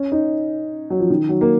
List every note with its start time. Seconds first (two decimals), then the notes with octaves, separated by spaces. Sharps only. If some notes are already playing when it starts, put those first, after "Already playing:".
Already playing: C#4
0.12 D#4
0.90 F#3
1.00 F3
1.10 D#3
1.29 F#3
1.41 A#3